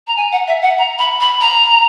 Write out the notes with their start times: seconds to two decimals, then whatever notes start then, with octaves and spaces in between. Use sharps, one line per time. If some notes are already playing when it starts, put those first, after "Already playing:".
0.07 A#5
0.16 G#5
0.31 F#5
0.47 E5
0.61 F#5
0.78 A#5
0.98 B5
1.20 B5
1.40 A#5